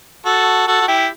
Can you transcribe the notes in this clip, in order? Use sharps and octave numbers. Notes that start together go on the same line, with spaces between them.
F#4 A4
F#4 A4
F#4
E4 G4